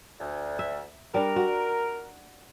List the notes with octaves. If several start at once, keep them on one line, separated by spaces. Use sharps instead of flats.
D2
E5
G3 D4 A#4
F#4